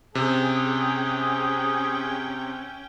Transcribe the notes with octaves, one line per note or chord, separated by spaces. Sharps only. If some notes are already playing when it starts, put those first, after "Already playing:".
C3 C#4 G#4 G5